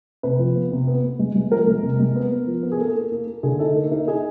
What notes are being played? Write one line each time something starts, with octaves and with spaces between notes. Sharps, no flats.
C3 B4
F3
B3
C3
B3
B3
G#3
G#3
F3 A#4
G#3
C3
G#3
B3
B3
F3
B3
G#4
A#3 A4
A#3
A#3
A#3
D3 G#4
D#4 A4
A#3
D#4 A#4
D#4 G#4